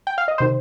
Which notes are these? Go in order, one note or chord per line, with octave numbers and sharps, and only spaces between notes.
G5
F5
D#5
C3 D#3 C5